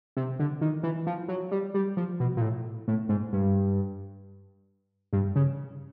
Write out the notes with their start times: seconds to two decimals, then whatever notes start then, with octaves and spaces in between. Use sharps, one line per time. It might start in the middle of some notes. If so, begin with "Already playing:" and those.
0.17 C3
0.39 D3
0.61 D#3
0.83 E3
1.07 F3
1.28 F#3
1.51 G3
1.74 G3
1.97 F3
2.20 B2
2.37 A#2
2.41 A2
2.88 A2
3.09 G#2
3.33 G2
5.13 G2
5.36 C#3